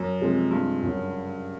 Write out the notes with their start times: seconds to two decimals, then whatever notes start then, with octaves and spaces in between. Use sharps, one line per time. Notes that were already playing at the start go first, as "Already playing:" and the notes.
Already playing: F#2
0.20 C3 F3 G#3 C4
0.51 G2
0.82 F#2 C#3 F#3